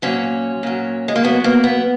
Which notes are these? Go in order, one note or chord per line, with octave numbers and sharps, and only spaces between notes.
A#2 F#3 C#4
A#2 F#3
G#3
A#3
A#2 F#3 B3
A#3
B3